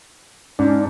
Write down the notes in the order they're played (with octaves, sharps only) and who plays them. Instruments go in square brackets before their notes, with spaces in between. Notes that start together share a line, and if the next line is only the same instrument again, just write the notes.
[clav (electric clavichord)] G#2 [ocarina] C#4 [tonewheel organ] D4